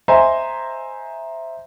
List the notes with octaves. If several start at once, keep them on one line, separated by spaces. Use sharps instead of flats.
C5 D#5 E5 G#5 A#5 C6